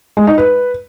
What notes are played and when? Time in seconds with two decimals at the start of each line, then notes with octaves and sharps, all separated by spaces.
0.17 G#3
0.27 D#4
0.38 B4